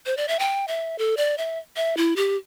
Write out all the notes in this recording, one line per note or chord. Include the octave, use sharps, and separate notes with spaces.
C5
D5
E5
G5
E5
A4
D5
E5
E5
E4
G4